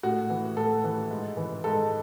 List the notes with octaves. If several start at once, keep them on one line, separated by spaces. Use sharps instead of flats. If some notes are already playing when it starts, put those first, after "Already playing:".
A2 F#4
E3
A2 A4
E3
G#2
E3
G#2 A4